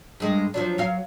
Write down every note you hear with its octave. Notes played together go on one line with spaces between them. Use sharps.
G2 G#3
F3 F#3 D4
F#3 F5